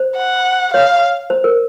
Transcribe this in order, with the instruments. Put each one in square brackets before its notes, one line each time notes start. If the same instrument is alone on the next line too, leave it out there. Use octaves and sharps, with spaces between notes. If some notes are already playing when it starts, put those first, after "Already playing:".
Already playing: [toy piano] C5
[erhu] F#5
[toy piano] C#5 [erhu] F5
[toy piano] C5
A#4